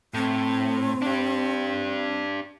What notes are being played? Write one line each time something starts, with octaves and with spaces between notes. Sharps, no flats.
A2 C4
D4 G4